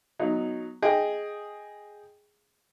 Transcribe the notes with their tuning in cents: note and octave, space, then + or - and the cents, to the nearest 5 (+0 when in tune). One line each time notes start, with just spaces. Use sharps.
F#3 +0 B3 +0 D#4 +0
G#4 +0 D#5 +0 G5 +5